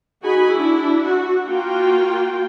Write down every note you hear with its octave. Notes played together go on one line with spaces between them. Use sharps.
D#4 F#4 G#4 G#5 B5
D4 E4
F#4
A#3 F4 F#4 G5